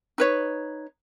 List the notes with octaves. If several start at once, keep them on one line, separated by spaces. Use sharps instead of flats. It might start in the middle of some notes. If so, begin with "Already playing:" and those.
D#4 B4 C#5